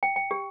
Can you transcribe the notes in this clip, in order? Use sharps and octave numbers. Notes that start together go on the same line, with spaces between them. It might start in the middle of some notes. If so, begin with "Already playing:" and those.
G5
G5
G4